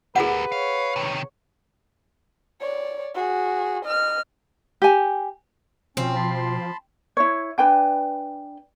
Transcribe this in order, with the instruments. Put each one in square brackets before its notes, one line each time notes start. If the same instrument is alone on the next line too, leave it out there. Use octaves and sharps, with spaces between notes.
[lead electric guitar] G4 A#4 [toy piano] G#4 F#5 [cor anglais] B4
[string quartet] C#5 [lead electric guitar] F5
[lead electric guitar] C3 D#3
[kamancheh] C#5 D5
F#4 G#4
D#5 F6
[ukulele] G4 G#5
[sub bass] B2 [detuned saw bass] F3 [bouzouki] C4 [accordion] C#4
[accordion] A5 B5 C6
[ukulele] E4 C#5
D4 B4 G5 G#5